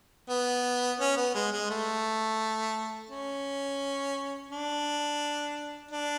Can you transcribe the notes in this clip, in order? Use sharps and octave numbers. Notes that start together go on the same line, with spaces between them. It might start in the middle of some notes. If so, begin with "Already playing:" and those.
B3
C#4
B3
G#3
G#3
A3
C#4
D4
D4